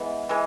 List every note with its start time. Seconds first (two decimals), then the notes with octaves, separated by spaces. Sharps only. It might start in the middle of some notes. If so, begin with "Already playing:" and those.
Already playing: E3 G#3 B3
0.29 E3 G#3